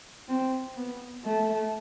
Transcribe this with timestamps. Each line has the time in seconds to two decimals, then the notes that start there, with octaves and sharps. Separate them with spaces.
0.28 C4
0.76 B3
1.25 A3